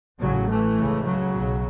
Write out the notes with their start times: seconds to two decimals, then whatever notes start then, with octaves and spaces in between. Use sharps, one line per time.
0.20 A1 A2 C#3 F#3
0.49 E3 A3
0.77 C#2 C#3
1.05 C#3 F#3
1.33 B1 B2